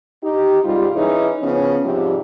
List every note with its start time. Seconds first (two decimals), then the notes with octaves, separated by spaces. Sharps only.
0.23 D#4 G4
0.64 G#2 C3 G3 F4
0.95 E3 C#4 D#4 E4 G#4
1.42 C#3 F3 B3 C#4
1.84 G#2 C3 F3 G3